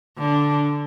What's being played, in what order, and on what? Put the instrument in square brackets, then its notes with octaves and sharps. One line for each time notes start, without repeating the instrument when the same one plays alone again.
[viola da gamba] D3